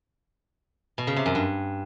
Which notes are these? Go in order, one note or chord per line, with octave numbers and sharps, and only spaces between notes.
B2
C#3
C3
F#2
G2